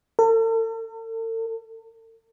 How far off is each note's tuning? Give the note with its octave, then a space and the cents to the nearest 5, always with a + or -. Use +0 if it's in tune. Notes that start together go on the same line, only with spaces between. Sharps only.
A4 +45